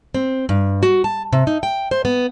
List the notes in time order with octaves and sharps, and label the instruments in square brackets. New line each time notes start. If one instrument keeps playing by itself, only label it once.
[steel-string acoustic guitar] C4
G2
F#4
A5
C3
D#4
G5
C5
B3